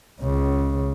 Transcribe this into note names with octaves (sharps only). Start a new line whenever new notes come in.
C#2 C#3